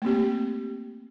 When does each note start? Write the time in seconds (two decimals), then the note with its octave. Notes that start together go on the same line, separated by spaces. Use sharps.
0.02 A3 A#3 C4 G4